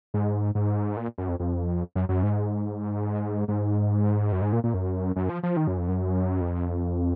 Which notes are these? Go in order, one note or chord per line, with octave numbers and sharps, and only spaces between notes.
G#2
G#2
A#2
F#2
F2
F2
F#2
F#2
G#2
G#2
F#2
G#2
A#2
A#2
F#2
F#2
F3
F3
D#3
F#2
F2
F#2
F2